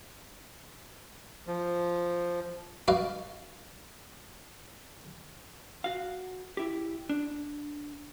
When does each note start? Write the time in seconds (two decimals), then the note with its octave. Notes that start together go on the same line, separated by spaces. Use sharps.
1.47 F3
2.88 F#4 B4 D5 D#5 F5
5.84 F#4 F5
6.57 E4 G4
7.09 D4